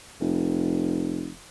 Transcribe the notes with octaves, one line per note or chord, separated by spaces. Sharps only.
F1